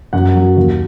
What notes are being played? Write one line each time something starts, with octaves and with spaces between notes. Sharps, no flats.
F#2 F#5
F#3
D#2